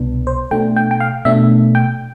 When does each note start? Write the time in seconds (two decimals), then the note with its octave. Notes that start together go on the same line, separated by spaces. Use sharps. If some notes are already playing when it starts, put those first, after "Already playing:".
Already playing: C2 B2 B3 D4
0.27 C5
0.51 B2 A3 D4 G5
0.76 G5
0.91 G5
1.00 F5
1.25 B2 A3 D4 E5
1.75 G5